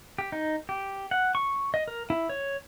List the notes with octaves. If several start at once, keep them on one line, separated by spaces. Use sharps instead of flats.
G4
D#4
G4
F#5
C#6
D#5
A#4
E4
C#5